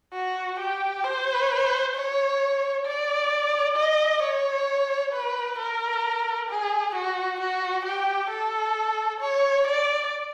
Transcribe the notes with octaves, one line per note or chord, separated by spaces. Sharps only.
F#4
G4
C5
C#5
D5
D#5
C#5
B4
A#4
G#4
F#4
F#4
G4
A4
C#5
D5